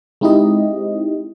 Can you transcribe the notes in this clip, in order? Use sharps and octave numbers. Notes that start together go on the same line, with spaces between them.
G#3 C4 D#4 E4 G4 D#5